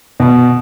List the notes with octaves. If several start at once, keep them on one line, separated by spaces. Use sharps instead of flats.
B2